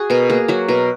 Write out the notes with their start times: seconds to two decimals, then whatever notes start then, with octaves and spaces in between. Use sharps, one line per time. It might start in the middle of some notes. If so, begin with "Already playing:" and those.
Already playing: F#4 G#4
0.10 B2 A#4
0.30 A#3 G#4
0.48 F#3 F#4
0.68 B2 A#4